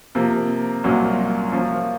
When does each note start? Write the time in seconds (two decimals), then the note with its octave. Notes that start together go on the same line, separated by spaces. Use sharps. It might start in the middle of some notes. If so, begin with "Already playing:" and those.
0.15 C3 F3 A#3
0.84 C2 A#2 F#3 A#3 C#4
1.52 F3 A#3 C#4 F4